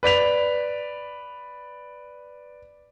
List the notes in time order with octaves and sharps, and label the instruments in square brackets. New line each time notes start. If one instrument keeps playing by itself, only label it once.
[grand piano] B4 D5 B6 F7